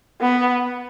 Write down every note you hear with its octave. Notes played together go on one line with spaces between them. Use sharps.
B3